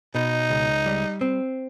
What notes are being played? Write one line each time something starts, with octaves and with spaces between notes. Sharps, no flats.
B2 D#4
C#2
G3
C4